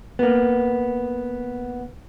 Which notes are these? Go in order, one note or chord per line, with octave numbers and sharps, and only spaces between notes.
A#3 B3